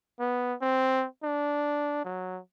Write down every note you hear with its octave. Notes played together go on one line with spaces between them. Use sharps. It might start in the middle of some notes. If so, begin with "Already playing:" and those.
B3
C4
D4
F#3